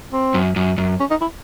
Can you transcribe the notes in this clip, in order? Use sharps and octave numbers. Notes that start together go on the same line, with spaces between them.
C4
F#2
F#2
F#2
C#4
D#4
E4